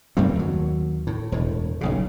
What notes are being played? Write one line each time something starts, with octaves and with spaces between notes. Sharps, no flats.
F#2 A3 A#3 C4
D#2 F#3
A2
E1 A2
F#1 B1 C#3